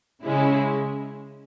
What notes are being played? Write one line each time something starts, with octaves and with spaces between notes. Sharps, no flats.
C#3 G#3 C#4 E4